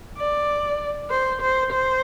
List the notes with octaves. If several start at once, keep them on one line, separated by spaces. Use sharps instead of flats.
D5
C5
C5
C5